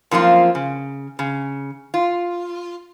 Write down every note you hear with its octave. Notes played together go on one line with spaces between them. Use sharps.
F#2 F3 A#3 C4 F4
C#3
C#3
F4